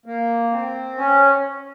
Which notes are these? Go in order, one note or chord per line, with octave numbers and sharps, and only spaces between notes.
A#3
C4
C#4